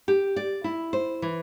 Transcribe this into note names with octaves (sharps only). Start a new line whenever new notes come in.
G4
D5
E4
C5
E3